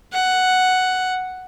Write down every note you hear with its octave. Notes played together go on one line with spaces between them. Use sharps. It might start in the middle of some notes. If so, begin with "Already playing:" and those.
F#5